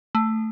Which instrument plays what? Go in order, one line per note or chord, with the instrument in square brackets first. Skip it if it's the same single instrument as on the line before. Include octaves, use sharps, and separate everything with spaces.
[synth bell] A3